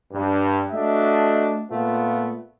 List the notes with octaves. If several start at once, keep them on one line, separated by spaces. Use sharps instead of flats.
G2
A3 D4 F#4 D#5 E5
A#2 A3 B3 F4